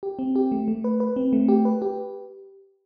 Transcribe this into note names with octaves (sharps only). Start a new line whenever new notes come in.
G4
C4
G4
A3
A3
B4
B4
C4
A3
G4
B4
G4